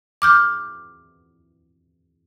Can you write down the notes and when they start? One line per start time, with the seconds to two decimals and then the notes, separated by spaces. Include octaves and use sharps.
0.22 D6 F6 G6